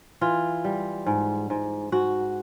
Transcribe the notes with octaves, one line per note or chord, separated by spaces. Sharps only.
E3 F4
G3
G#2
G#2
G#2 F#4